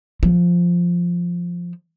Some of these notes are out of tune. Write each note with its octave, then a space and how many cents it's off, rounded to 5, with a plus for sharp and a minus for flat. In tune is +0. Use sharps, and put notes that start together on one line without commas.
F3 +0